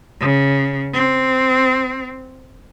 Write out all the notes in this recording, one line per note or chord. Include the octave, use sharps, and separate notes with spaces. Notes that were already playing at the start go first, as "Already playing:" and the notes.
C#3
C4